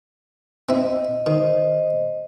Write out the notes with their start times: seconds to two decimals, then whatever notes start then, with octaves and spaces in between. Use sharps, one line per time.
0.69 C4 E4 D#5
1.26 D#3 C5 D#5